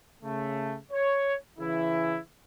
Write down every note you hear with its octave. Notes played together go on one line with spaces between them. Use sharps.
C#3 A3
C#5
C#3 E3 E4